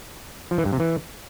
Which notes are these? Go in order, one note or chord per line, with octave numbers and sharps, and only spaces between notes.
F3
E3
G2
C3
E3